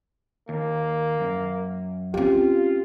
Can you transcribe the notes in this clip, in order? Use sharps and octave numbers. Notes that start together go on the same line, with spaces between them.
D#2 A#3
F#2
C4 C#4 F4 G4